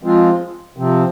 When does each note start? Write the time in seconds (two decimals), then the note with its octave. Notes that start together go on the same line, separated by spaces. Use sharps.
0.03 F3 G#3 C4 F4
0.77 C3 F3 C4